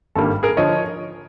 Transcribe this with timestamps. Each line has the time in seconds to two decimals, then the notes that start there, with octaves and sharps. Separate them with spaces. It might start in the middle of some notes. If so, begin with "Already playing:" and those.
0.15 G#1 G2 D#3 G3 A#3 A4
0.43 G#4 A#4
0.57 D3 F3 C#5 D#5